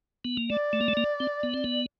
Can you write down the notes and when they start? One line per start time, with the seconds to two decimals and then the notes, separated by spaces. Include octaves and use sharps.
0.25 B3
0.37 A#3
0.50 A3 D5
0.73 A3
0.81 A#3
0.88 A3
0.97 A#3
1.20 C4
1.43 B3
1.54 C4
1.64 B3